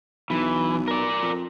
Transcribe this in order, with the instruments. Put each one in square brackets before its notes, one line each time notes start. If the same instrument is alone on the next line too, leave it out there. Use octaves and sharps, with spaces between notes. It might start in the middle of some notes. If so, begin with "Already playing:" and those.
[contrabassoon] B1 [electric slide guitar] E3
[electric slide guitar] A#4 D5
[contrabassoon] F2